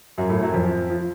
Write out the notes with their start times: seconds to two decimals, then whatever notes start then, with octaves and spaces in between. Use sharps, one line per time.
0.18 F#2 F#3
0.30 A2 A3
0.42 F#2 F#3
0.54 F2 F3
0.90 F3